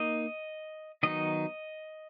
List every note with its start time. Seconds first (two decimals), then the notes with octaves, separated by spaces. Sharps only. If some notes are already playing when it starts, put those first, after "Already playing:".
Already playing: A#3 D#4 D#5
1.03 D#3 F#3 B3 D#4 D#5